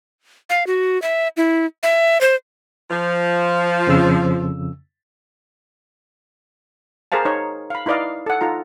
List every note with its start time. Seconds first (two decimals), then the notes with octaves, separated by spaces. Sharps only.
0.50 F5
0.67 F#4
1.02 E5
1.37 E4
1.83 E5
2.21 C5
2.91 F3
3.87 F2 C#3 E6
7.12 G#4 A#4 C5 F5 A5
7.25 D#4 C#5
7.70 F5 B5
7.86 D#4 E4 B4 D5 D#5 F5
8.26 A4 F#5
8.41 D#4 F4 A4 A#5